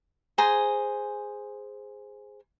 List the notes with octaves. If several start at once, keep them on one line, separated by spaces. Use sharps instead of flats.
G#4 C5 G#5 A#5